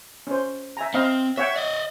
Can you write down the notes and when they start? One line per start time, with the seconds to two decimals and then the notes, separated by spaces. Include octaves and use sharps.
0.27 C#4 C5
0.77 E5 G#5 A#5
0.94 C4 C5 D#5 F5
1.38 C#5 E5 F#5 G5
1.56 D5 D#5